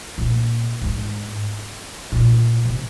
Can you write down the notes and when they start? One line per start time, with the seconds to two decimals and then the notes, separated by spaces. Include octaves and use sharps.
0.18 A#2
0.81 G#2
2.12 A#2
2.65 C3